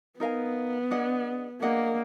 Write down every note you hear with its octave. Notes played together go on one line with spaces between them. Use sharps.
B3 D#4 A#4 F5 G#5
D4 G#4 D#5 F#5
A#3 D4 G#4 D#5 F#5